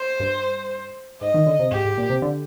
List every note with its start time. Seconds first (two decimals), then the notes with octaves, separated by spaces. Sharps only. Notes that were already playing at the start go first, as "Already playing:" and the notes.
Already playing: C5
0.20 G2
1.21 G#2 D#5
1.34 D#3
1.47 D3
1.59 C3
1.72 G#2 G4
1.85 G#2
1.97 A#2
2.10 C3
2.22 D3